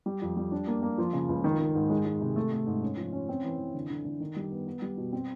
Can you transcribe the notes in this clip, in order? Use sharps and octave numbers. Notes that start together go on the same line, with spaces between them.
G3
F2
G3
D4
A#3
A#3
F3
C#3
C#2
D#3
D#3
G#2
G#3
G#3
C3
A3
A3
G#2
C#4
F3
C#4
C4
E3
E3
D3
D3
D3
D#3
G3
B3
B3
G3
B2
C4